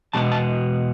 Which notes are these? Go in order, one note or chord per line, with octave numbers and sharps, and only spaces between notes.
E2 B2 G#3 B3 A5
A5